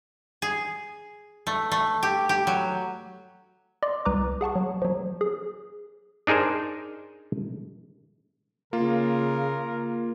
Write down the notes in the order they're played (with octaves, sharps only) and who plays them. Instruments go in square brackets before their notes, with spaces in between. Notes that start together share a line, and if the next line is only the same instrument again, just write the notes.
[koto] G#4
A3
A3
G4
G4
F#3
[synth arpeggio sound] D5 D#5 C6 D6
C2 B4 A#5 D6
G#4 F#5 A5 C#6
F#3
F3 F#3
G#4
[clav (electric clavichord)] D4 D#4 G#4 A#4 C5
[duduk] C#3 [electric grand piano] A#3 F4 [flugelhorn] A#4